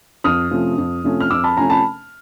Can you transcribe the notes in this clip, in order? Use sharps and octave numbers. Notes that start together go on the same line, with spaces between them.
F2 D#6 F6
C3 F3 A3 C#4
F2
C3 F3 A3 C#4
F6
F2 D6 E6
A5 B5
C3 F3 A3 C#4 G#5 A#5
A5 B5